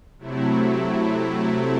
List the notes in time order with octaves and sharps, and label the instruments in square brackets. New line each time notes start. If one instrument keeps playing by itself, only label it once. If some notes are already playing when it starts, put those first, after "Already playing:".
[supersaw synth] C3 F#3 A3 E4